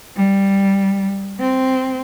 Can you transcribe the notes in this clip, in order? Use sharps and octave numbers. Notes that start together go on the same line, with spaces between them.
G3
C4